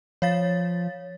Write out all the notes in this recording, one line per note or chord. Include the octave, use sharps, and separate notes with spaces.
F3 C#5 F5 A6